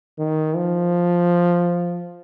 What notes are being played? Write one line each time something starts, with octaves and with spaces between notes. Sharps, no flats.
D#3
F3